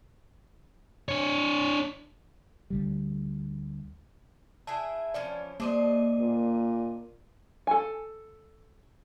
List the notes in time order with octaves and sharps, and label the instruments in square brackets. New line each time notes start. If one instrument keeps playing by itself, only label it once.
[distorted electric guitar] D4 C#5
[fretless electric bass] D2 D3 G3
[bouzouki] E4 G#4 E5 [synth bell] G#5 A5
[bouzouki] E3 F3 C#4 [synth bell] D5
[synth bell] A#3 D6 D#7 [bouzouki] D4 C5 D#5
[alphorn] A#2
[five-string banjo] A4 G#5